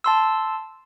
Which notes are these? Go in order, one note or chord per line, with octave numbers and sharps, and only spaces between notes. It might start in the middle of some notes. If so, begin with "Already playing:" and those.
A5 C6 E6